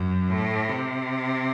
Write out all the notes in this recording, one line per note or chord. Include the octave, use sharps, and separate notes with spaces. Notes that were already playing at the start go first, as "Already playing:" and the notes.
Already playing: F#2
A2
C3